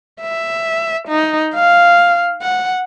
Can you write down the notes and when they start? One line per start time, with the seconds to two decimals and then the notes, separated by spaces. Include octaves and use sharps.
0.21 E5
1.08 D#4
1.55 F5
2.42 F#5